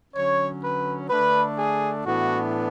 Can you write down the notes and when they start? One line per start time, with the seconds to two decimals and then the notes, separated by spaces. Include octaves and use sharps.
0.14 D3 F#3 C#4 C#5
0.63 B4
1.09 D3 A3 D4 B4
1.57 G#4
2.05 A2 E3 B3 D4 F#4